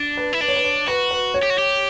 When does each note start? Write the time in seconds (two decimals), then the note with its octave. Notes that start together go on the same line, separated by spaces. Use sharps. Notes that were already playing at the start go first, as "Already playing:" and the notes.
Already playing: D4
0.17 B4
0.33 E4
0.41 D4 B4
0.48 C#5
0.56 B4
0.64 C#5
0.88 F#4 B4
1.11 B4
1.34 C#5
1.43 G4
1.50 F#4
1.58 G4